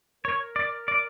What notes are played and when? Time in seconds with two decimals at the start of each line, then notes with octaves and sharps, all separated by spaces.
0.24 A#4 C#5
0.56 D5
0.88 D5